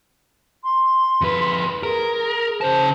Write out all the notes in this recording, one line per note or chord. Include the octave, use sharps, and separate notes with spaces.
C6
F2 B4
G#4 A#4
C#3 C5 A5